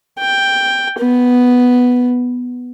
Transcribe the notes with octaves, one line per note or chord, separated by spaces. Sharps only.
G5
B3